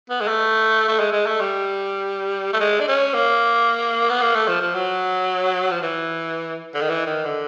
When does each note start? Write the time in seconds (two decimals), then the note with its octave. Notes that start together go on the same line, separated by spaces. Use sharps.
0.10 B3
0.21 G#3
0.28 A3
0.88 A3
1.00 G#3
1.13 G#3
1.26 A3
1.40 G3
2.53 A3
2.60 G#3
2.80 D4
2.88 C#4
3.14 A#3
4.10 B3
4.21 A#3
4.35 A3
4.48 F3
4.61 F3
4.75 F#3
5.71 F3
5.82 E3
6.74 D3
6.81 D#3
6.89 E3
7.07 D#3
7.25 D3